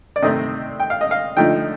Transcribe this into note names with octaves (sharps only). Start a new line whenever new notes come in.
D5
C3 D#3 A3 C4 D#5
G5
F5
D#5
F5
D3 F3 A3 D#4 G5